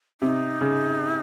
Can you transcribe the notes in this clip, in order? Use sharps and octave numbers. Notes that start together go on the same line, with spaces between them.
C3 D#4
C#3